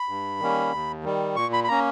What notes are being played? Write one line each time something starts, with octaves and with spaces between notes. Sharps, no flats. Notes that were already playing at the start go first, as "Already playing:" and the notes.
Already playing: B5
G2
D#3 G3 A#3 C#4
D#2
D#3 G3
A#2 C#6
B5
B5
A#3 C#4 A#5